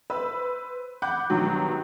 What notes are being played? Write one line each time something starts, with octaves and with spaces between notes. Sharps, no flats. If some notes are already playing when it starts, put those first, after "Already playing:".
B4 C5 B5 E6
F#5 B5 D6 F#6 G6
G2 B2 D#3 F#3